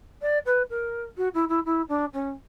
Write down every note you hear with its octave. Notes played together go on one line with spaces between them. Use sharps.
D5
B4
A#4
F#4
E4
E4
E4
D4
C#4